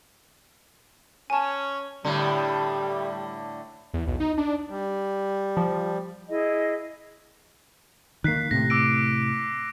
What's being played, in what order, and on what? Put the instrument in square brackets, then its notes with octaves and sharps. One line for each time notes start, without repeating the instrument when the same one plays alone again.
[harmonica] C#4 C#5 [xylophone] G#5 A5
[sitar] A2 D3 [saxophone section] G3
[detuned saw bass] E2
B1
D#4
D4
[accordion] G3
[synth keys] F3
[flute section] E4 G#4 D#5
[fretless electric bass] D#3 A#3 [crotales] F#6 B6 C7
[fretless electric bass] A2 C3 [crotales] A#6
[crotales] D6 E6 D7